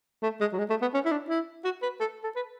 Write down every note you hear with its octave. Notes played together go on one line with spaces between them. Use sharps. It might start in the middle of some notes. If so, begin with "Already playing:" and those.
A3
G#3
F#3
G#3
A3
B3
C#4
E4
D4
E4
F#4
B4
A4
A4
B4